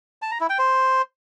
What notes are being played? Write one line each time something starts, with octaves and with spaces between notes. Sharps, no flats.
A5
A#5
E4
G5
C5